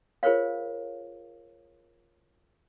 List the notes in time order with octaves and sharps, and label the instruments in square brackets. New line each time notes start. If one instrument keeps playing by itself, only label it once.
[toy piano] F4 G#4 A#4 C5 C#5 F5